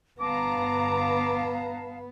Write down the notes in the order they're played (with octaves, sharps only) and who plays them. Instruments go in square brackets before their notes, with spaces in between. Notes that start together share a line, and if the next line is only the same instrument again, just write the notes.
[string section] G1 A#5 [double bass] B3 [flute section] F5 A5 [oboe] D6